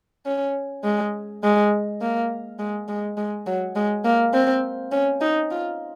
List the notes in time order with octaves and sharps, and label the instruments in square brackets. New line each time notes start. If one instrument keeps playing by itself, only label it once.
[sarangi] C#4
G#3
G#3
A#3
G#3
G#3
G#3
F#3
G#3
A#3
C4
C#4
D#4
F4